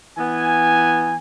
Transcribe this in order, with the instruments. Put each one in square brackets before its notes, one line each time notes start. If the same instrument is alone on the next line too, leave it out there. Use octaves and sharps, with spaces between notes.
[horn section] E3 B3 G#5